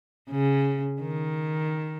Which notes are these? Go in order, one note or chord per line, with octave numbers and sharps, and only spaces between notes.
C#3
D#3